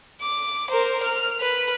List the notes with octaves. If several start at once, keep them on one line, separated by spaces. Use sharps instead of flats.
D6
A#4 C5
F6
B4